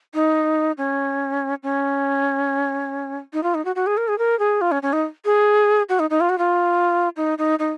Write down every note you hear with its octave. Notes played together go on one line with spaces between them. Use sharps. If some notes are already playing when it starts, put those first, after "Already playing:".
D#4
C#4
C#4
D#4
F4
D#4
F#4
F#4
G#4
A#4
G#4
A#4
G#4
F4
C#4
C#4
D#4
G#4
F#4
D#4
D#4
F4
F#4
F4
D#4
D#4
D#4